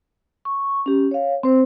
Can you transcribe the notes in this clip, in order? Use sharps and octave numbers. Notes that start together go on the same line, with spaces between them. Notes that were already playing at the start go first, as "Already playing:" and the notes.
C#6
C#4 G4
C#5 F5
C4 C5